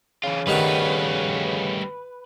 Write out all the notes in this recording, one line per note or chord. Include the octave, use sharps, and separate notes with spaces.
C#3 E3 F4
G2 D#3 G3 A3 F#4 B4